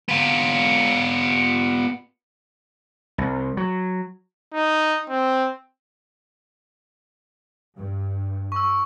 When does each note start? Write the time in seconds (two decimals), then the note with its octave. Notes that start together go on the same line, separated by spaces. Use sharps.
0.09 B3 F4
3.18 C2
3.57 F#3
4.54 D#4
5.09 C4
7.77 G2
8.52 C#6 E6